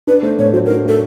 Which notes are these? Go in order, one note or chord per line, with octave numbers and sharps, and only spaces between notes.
D4 B4
A3 C5
A2 C#5
F#3 C5
A#4
D4
A3 A4